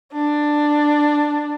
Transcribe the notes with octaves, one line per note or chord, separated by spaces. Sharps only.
D4